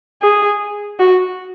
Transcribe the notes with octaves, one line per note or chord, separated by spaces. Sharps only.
G#4
F#4